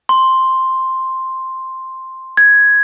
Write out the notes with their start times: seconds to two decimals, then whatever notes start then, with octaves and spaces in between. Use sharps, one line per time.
0.09 C6
2.37 G#6